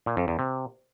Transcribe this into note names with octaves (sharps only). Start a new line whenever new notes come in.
A#2
F2
E2
C3